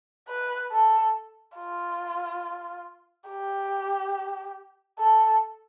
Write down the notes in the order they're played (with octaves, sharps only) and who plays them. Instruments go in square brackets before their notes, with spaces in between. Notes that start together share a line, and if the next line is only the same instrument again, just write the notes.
[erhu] B4
A4
F4
G4
A4